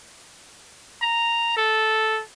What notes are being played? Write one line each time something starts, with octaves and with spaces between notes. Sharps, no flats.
A#5
A4